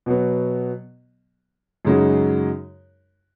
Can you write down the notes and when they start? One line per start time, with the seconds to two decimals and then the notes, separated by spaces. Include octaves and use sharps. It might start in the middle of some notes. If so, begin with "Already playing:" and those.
0.06 B2 F#3 B3
1.85 F#2 C#3 G#3 D#4 F#4